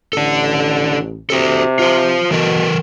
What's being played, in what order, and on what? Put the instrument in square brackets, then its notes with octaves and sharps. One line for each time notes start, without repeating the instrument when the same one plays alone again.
[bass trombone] A1 [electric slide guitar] D4 A4
[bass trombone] C3 [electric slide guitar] F#4 A4
[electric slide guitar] F4 C5
[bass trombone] B2 [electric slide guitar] E3 A4 A#4